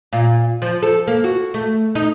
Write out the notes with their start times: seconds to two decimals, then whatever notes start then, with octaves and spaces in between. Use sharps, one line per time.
0.13 A#2
0.62 F3
0.82 A4
1.07 A#3
1.24 F#4
1.54 A3
1.95 D#4